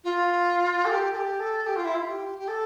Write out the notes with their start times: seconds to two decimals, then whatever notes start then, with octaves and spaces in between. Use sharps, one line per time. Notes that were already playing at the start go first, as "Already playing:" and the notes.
0.04 F4
0.85 A4
0.90 G4
1.13 A4
1.17 G4
1.40 A4
1.66 G4
1.76 F4
1.85 E4
1.95 F4
2.08 G4
2.38 G4
2.48 A4